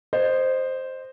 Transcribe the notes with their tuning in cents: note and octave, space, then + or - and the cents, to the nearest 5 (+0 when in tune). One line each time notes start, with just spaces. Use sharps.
C5 +0 D#5 -20